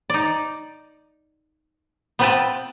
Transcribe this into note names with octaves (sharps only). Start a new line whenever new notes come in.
D#4 D5
B3 C4 F4 B4 G5 A5